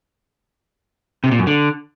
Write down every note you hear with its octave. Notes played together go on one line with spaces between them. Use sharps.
C3
A#2
F#2
D3